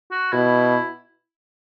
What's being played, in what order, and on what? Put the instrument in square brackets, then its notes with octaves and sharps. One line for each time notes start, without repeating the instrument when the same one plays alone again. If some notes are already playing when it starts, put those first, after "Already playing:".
[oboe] F#4
[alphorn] B2 [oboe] E4